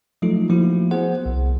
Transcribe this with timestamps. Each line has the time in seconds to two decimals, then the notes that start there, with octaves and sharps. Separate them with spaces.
0.22 F3 F#3 A3 D#4 F4 A4
0.49 F3 A#3 E4 F#4
0.91 B3 G#4 C5 F#5
1.26 C2